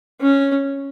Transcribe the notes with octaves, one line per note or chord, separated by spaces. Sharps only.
C#4